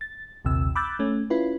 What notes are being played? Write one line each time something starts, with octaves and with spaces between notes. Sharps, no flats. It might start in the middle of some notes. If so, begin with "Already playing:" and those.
A6
A#1 D#2 C3 E6
B5 D6 E6 F#6 G6 A6
A3 C#4
C#4 E4 F4 B4